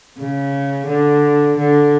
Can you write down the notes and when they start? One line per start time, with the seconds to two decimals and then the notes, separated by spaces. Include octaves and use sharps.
0.18 C#3
0.87 D3
1.57 D3